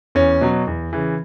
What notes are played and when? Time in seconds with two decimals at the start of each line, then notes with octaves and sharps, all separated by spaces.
0.15 E2 C#4
0.41 B2 F#3
0.67 E2
0.93 C#3 E3